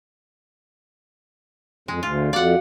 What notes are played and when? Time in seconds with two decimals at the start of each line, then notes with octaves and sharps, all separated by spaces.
1.88 F2 G#3
2.03 D2 F4
2.33 F2 F#4 D5 F5 F#5